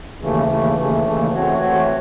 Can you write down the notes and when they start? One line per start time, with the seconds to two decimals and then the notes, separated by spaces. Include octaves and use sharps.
0.20 D#2 C#3 E3 A3
0.48 D#2 C#3 E3 A3
0.76 D#2 C#3 E3 A3
1.04 D#2 C#3 E3 A3
1.32 E3 A3 C4 F#4 C#5
1.60 E3 A3 C4 F#4 C#5